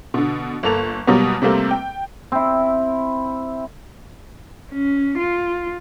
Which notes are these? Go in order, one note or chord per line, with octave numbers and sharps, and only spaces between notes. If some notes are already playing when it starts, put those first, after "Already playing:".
B2 D3
G1 A#3 A4 F7
B2 F#3 G3 A#3 B3
C3 G3 A3 A#3 C4
G5
C4 E4
C#4
F4